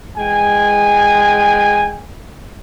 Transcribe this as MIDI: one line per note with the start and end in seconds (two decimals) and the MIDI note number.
0.18 2.01 52
0.18 2.01 56
0.18 2.01 79
0.18 2.01 80